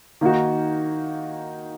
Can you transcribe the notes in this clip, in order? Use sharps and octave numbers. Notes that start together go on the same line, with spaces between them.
D#3 A#3 D#4 F#4